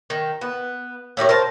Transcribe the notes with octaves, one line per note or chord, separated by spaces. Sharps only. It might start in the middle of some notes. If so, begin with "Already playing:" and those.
D#3
B3
A2 G4 A#4 C#5
A#4 C5 A5